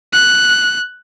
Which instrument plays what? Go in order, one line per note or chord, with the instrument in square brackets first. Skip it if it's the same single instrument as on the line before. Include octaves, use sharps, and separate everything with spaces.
[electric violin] F#6